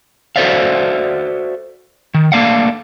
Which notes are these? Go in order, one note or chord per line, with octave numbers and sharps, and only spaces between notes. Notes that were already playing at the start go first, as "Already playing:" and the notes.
F#4 A4 C5 D5 E5 F5
D#3
A3 A#3 D4 F5 F#5